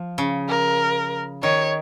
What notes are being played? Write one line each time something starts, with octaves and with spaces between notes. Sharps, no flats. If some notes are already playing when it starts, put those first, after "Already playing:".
Already playing: F3
C#3
A#4
D#3 C#5